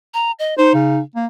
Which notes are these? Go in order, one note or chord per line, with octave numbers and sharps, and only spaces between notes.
A#5
D#5
D#4 C5
C#3
A#3